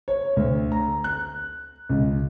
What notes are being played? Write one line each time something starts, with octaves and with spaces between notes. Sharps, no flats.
C#5
D2
A#5
F#6
C#2